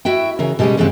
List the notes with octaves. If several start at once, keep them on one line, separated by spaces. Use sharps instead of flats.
E4 F#4 E5 G5
C#3 E3 A#4
B2 G3 G#3 C#4 G4 G#4
E2 G2 C#3 E3 G#3 C4